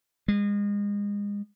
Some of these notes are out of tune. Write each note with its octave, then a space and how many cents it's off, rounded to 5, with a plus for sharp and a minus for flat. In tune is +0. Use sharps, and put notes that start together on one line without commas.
G#3 -30